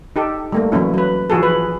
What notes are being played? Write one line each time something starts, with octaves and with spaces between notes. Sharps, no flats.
D#4 G4 A4
G3 A3 A#3
E3 F#3 A#3 C#4 E4
F#3 B4
E3 F3 F#4 G#4 A4
B4